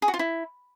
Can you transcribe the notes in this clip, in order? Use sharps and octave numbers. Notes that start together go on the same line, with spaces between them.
G#4
F#4
F4
E4